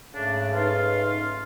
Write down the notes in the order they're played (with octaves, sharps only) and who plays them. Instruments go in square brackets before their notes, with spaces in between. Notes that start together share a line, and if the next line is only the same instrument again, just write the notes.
[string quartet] G#2 A3 [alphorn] C#3 [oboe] D4
[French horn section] D#4 B4 [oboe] F4